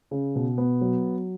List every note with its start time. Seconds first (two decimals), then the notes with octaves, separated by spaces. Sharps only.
0.11 C#3
0.36 B2
0.58 B3
0.81 F#3